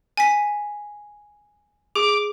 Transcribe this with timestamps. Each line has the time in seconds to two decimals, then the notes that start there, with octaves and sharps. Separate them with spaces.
0.17 G#5 B6
1.95 G#4 D6